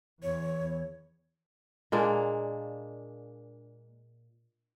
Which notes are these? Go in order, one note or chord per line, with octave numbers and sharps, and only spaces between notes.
E2 C#5
A#2 G#3 A#3 D4